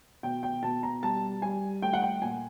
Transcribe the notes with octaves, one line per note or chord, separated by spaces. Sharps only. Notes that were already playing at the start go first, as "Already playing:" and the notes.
B2 G5
G5
B2 A5
A#5
G3 A5
G3 G#5
A3 G5
F#5
G5
A#2 G#5